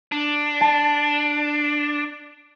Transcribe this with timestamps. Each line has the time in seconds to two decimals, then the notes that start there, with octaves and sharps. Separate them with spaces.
0.12 D4
0.61 A5